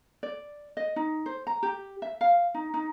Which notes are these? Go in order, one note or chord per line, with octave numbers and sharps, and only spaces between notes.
D5
D#5
D#4
C5
A#5
G4
E5
F5
D#4
D#4